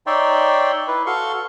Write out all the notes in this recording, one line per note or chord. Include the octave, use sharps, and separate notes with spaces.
D#4 C#5 D5 E5 G5 C6
E4 B4
F#4 A4 F5 C6 C#6